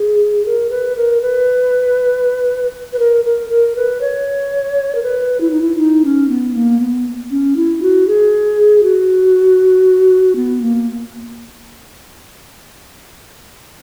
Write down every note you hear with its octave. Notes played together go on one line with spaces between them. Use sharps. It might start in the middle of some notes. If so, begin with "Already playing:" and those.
Already playing: G#4
A#4
B4
A#4
B4
B4
A#4
A#4
A#4
B4
C#5
A#4
B4
E4
D#4
E4
D#4
C#4
B3
A#3
B3
C#4
E4
F#4
G#4
F#4
B3
A#3